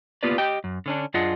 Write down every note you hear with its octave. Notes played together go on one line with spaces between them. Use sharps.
A#3 B3 F4 G4 B4 D5
G4 D#5 G5
F#2
D3 C#4 D4
F#2 D4 F4 G#4 D#5 F#5